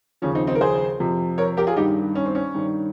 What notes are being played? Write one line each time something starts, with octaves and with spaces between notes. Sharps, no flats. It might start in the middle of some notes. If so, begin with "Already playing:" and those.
D#2 C#3 F3 C#4
C4 D#4
C4 D#4
A#4
G#4 C5
F2 C3 F3
A#4 C#5
G4 A#4
F4 G#4
G2 D#3 D#4 G4
C#4
C4
C#4
G2 D#3